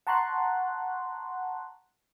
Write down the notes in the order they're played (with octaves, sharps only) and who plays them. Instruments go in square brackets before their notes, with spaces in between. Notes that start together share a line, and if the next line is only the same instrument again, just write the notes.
[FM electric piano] F#5 A5 A#5 C6 C#6 F#6